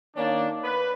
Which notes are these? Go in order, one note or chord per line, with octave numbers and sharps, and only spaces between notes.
D#3 A#3 C#4 D4
B4